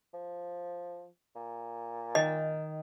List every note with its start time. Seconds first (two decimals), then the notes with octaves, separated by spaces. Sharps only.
0.14 F3
1.36 A#2
2.15 D#3 D#5